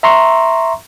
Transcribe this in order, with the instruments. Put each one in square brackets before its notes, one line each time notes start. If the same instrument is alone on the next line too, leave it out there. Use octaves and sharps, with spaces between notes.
[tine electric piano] E5 A#5 C6 C#6